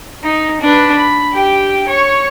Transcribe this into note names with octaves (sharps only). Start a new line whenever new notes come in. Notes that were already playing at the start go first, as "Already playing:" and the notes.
D#4
D4 B4
B5
G4 G5
C#5 C#6